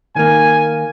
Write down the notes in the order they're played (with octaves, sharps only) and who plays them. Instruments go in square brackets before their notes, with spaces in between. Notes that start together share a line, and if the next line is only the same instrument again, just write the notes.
[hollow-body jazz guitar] D#3 A#3 [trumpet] G#5